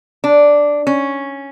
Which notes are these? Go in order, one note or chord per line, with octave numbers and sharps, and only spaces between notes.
D4
C#4